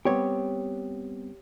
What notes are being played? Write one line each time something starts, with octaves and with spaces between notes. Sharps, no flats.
G3 B3 C4 G4 C#5